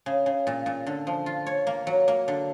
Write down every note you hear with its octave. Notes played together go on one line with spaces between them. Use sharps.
C#3
C#3
A#2
A#2
D3
F3
F4
C#5
A#3
F#3
A#3
D3